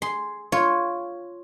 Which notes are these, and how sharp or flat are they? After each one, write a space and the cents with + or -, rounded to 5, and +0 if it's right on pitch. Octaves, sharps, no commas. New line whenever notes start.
G#4 +0 C6 -5
F4 +0 C#5 +0